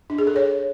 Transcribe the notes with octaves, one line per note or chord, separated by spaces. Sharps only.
D4
G#4
A4
C#5